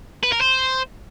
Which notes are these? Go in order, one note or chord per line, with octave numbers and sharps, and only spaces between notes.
B4
A#4
C5